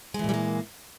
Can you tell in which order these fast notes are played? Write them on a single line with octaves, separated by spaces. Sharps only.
G#3 E3 A#2 G3 A#3